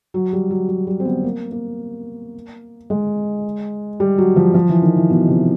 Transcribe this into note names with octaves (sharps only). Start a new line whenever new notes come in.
F#3
G3
F#3
F#3
G3
C4
B3
A#3
A#3
G#3
G3
F#3
F3
F3
E3
D#3
E3
B2
C3